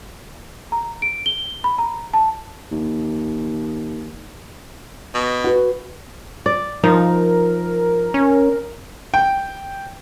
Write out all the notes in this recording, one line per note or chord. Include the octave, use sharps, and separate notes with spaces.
A#5
D7
G7
B5
A#5
A5
D#2
B2
F#4 B4
D5
F3 D#4 A#4
C#4
G5